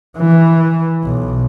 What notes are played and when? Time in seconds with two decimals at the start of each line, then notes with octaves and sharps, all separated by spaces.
0.17 E3
1.03 B1